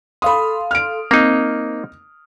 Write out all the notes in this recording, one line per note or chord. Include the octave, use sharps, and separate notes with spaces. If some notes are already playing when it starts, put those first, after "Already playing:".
A4 F5 B5 C6 D#6
F6 D7
A#3 C4 D#4